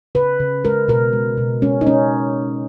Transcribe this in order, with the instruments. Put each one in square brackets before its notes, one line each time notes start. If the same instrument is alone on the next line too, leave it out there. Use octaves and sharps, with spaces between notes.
[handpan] C#3 B4
C#3
G#3 A#4
B2 A#4
G#3
B2
G#3 C#4
D#4
G#3 C#4